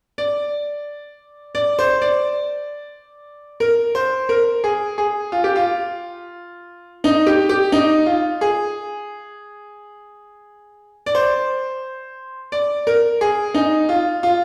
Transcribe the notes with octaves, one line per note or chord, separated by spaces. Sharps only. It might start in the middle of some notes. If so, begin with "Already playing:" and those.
D5
D5
C5
D5
A#4
C5
A#4
G#4
G#4
F4
G4
F4
D#4
G4
G4
D#4
F4
G#4
D5
C5
D5
A#4
G#4
D#4
F4
F4